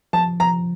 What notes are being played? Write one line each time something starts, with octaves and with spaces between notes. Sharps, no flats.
F3 A5
F3 A#5